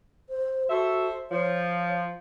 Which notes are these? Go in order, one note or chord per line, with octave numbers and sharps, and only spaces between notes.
C5
F#4 A4 C5 E5
F3 C#5